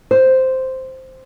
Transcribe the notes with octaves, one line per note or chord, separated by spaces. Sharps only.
C5